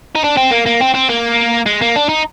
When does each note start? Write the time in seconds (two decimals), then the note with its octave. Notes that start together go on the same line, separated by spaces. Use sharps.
0.15 D#4
0.24 D4
0.37 C4
0.52 A#3
0.66 A#3
0.81 C4
0.95 C4
1.10 A#3
1.66 G#3
1.82 A#3
1.96 D4
2.09 D#4